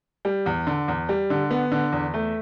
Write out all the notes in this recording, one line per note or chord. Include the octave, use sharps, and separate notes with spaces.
G3
E2
D3
E2
G3
D3
B3
D3
E2
A3